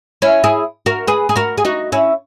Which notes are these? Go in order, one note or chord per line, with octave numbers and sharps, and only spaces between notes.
C#4 E4
E4 G#4
F#4 A#4
G#4 B4
G#4
F#4 A#4
G#4
D#4 F#4
C#4 E4